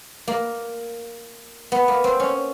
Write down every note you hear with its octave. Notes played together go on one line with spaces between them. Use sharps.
A#3
B3
A#3
C4
C#4